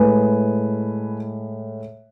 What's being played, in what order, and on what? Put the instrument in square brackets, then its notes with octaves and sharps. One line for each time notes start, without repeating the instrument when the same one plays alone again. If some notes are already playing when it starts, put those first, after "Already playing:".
Already playing: [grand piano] A2 G#3 G#4 B4